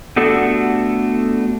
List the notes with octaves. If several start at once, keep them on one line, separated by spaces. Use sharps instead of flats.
A3 B3 D4 F#4 G4 A4